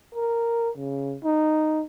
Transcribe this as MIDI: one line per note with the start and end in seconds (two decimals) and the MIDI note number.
0.14 0.70 70
0.77 1.16 49
1.24 1.83 63